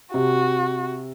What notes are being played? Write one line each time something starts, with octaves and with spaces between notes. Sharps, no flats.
C3 F#4